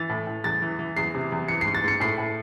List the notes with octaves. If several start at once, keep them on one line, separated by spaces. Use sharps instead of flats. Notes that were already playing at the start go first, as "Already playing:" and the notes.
Already playing: E3 A6
A2
A2
E2 A6
E3
E3
E2 C7
C3
E2
E3 C#7
G#2 C7
A6
G#2 C#7
A2 C7
A2